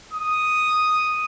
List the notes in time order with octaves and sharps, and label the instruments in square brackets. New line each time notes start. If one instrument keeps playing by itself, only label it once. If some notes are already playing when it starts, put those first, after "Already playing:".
[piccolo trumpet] D#6